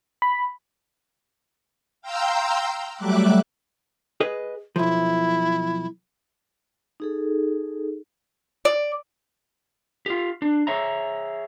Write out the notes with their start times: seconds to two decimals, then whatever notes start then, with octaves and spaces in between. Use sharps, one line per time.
0.22 B5
2.01 F5 G5 A#5 C6 E6 G6
2.96 F#3 G3 A3 E5 D6 F#6
4.20 G#4 B4 D#5
4.76 B1 F3 E4
7.00 D#4 G#4 A4
8.65 D5
10.06 F4 G4
10.42 D4
10.67 G#4 C#5 E5 A#5